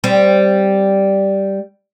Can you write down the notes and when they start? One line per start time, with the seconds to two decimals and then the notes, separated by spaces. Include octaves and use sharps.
0.04 G3 C4